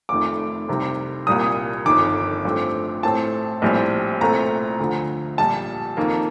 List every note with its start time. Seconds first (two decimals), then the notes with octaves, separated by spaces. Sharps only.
0.09 F1 F2 D#3 A3 D6
0.69 C2 C3 D#3 G3
1.27 C2 A#2 G3 A#3 D#6
1.86 G1 F2 D#3 D6
2.45 A1 G2 F3 A3 C4
3.03 A1 A2 A3 C4 A5
3.62 A#1 A2 G3 C4
4.21 C2 A#2 A3 C4 A#5
4.79 D2 D3 F3
5.38 A#1 A#2 G3 A5
5.97 F2 D#3 A#3